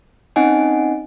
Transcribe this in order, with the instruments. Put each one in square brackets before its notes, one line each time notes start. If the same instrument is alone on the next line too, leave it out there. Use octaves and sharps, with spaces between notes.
[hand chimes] C4 C#4 D#4 D#5 F#5 G#5